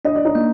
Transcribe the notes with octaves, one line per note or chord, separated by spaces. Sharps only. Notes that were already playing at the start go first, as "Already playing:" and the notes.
D4 D#5
D5
D#4 D#5
A#3